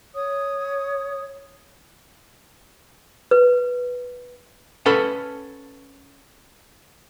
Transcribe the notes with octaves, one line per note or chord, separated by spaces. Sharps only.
C#5 D#6
B4
C#4 A4 B4 F#5